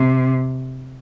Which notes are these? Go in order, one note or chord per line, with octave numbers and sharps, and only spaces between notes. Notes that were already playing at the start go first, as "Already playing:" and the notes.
Already playing: C3